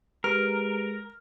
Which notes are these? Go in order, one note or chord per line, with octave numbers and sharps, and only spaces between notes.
G#3 G4 A#4 B4 F6 D7